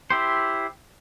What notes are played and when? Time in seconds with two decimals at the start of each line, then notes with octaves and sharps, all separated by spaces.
0.10 E4 G4 C5